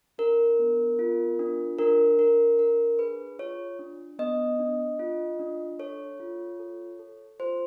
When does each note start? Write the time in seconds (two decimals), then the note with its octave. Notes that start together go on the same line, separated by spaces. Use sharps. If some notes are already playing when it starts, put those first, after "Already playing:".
0.18 D4 A#4
0.59 B3
0.99 F4
1.39 D4
1.79 D4 A#4
2.19 D4 A#4
2.59 D4 A#4
2.99 G#4 B4
3.39 F4 C#5
3.79 D4
4.19 B3 D#5
4.59 D4
4.99 F4
5.39 D4
5.79 A4 C#5
6.20 F4
6.59 A4
6.99 A4
7.40 F4 C5